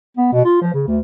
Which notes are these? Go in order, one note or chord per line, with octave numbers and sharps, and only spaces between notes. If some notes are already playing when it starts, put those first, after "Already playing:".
B3
B2
F4
F3
C#3
D2